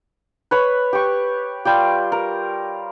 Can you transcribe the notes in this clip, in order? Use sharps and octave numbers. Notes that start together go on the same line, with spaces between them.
B4 C#5 B5
G4 C#6
G3 F4 G4
A#4